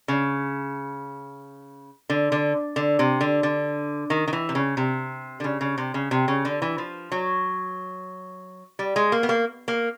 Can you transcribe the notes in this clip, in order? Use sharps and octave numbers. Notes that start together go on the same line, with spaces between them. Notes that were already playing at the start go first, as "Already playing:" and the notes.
C#3
D3
D3
D3
C3
D3
D3
D#3
D#3
E3
C3
C#3
C3
D3
C#3
C#3
C3
C#3
C3
C#3
D3
E3
F3
F#3
G3
G#3
A#3
B3
A#3
A#3